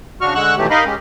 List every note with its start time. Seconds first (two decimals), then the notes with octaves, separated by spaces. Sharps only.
0.21 C#3 D4 F#4 C#6 F6
0.35 D3 G#3 F#5 C#6 E6 F#6
0.57 B2 D#3 E3 F#3 A3 G4
0.70 D#4 A#4 D#5 F5 B5
0.85 G#3 C#4 G4